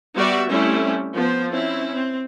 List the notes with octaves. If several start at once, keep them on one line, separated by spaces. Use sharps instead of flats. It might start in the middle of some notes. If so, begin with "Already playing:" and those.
G3 B3 F#4 D5 E5
G3 A3 C4 C#4 E4
F3 B3 C5
C4 C#4 E4
C4